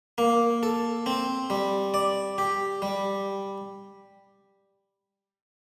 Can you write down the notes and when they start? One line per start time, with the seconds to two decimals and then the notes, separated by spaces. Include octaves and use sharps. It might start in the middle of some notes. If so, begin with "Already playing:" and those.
0.18 A#3
0.63 A4
1.06 C4
1.50 G3
1.94 D5
2.38 G4
2.82 G3